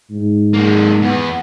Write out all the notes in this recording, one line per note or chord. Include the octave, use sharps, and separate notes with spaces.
G#2
G#3 A#3
E2 B3